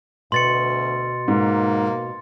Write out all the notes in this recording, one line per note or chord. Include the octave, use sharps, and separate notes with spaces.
D2 B2 C6 A6 C#7
G#2 A#3